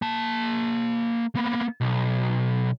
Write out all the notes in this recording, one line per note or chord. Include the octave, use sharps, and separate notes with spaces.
A#3 A5
A#3 B3
B1